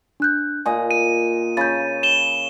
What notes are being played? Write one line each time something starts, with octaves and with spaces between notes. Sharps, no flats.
D4 F#6 G6
A#2 D#5 G#5
D#7
C#3 B5 G6 A6
E7 G7